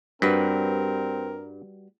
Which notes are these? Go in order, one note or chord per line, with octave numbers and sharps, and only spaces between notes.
G2 G3 C4 F#4 A#4 B4